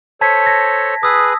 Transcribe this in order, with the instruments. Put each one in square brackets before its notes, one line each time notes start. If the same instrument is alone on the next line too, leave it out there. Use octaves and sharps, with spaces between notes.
[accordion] A4 C5 C#5 [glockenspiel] A5 G#6 B6
[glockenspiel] A#6
[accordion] G#4 B4 [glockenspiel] D#6 E6